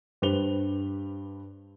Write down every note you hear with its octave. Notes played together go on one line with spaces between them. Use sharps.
G2 G4 B4 C5 F7 G7